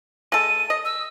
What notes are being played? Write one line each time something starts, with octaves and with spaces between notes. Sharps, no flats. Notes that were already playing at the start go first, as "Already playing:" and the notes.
G#3 A4 D#7
D#5
E6